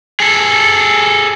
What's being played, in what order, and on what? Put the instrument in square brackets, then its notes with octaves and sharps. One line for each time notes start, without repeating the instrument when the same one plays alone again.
[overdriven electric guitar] G#4 A4